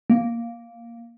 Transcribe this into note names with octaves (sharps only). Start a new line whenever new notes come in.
A#3